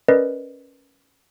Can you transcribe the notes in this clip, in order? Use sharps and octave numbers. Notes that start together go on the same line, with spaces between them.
C#4 A#4 B4 D5 D#5